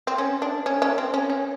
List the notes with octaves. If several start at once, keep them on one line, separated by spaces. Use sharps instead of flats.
C4
C#4
D4
C#4
C#4
C4
C#4
C#4